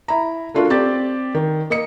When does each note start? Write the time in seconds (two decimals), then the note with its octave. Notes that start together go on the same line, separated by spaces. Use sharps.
0.08 E4 A#5
0.54 A3 D4 F4 F#4 A4 A#4
0.70 C4 G4 D5 A6
1.35 D#3
1.70 A#3 D#5 C#7